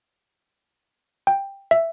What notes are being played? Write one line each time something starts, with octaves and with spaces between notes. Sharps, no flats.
G5
E5